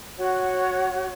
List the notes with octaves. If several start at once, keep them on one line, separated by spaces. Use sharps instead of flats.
F#4 C#5 F#5